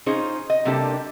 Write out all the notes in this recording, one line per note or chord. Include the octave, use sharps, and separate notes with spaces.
C#4 D#4 F4 G#4 C5
D#5
C3 G3 A#3 D4 G4 A4